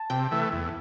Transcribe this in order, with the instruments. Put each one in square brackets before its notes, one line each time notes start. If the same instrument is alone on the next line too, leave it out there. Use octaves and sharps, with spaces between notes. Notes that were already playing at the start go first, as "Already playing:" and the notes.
Already playing: [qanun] A5
[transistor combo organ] C3 [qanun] G5
[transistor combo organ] E3 A3
E2